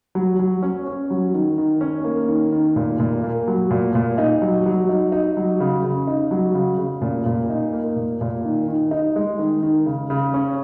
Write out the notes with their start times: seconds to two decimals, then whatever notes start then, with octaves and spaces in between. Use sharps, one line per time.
0.15 F#3
0.39 F#3
0.62 C#4
0.87 C#4
1.10 F#3
1.34 D#3
1.58 D#3
1.81 C#4
2.04 A#3
2.28 D#3
2.52 D#3
2.76 A#2
3.00 A#2
3.24 A#3
3.48 F#3
3.71 A#2
3.95 A#2
4.18 D#4
4.42 F#3
4.66 F#3
4.89 D#4
5.12 D#4
5.37 F#3
5.60 C#3
5.84 C#3
6.07 D#4
6.31 F#3
6.54 C#3
6.79 C#3
7.02 A#2
7.26 A#2
7.50 D#4
7.73 A#3
7.96 A#2
8.21 A#2
8.45 D#3
8.68 D#3
8.91 D#4
9.16 G#3
9.38 D#3
9.63 D#3
9.86 C#3
10.10 C#3
10.34 C#4